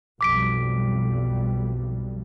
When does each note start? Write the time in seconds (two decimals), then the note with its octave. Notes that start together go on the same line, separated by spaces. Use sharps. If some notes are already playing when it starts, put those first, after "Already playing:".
0.21 B1 F2 G3 D6 B6 D7